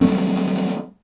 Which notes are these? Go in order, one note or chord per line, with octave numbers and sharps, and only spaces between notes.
F#3 G3 A3 C4